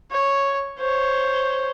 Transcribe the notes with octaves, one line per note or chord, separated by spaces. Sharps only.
C#5
C5 C#5